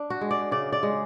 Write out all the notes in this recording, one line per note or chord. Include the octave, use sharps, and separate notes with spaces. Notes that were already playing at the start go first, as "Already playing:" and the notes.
Already playing: D4
F#4
G#3
D5
C#3 D5
D5
G#3